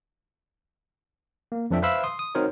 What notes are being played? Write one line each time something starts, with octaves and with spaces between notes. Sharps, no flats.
A#3
F2 F3 D4 A4 E5 G5
B4 C5 E5 F5 B5 E6
C6 D#6
D#6
C4 D#4 F#4 A#4 C5 C#5